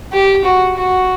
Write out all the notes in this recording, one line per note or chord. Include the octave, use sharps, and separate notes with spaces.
G4
F#4
F#4